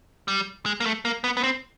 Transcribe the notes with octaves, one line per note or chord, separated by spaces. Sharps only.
G3
G#3
A#3
A3
A#3
B3
B3
C4